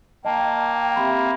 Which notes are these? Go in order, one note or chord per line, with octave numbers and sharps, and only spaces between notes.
A#3 D#5 G5 A5
C4 G4 E5 B5 C6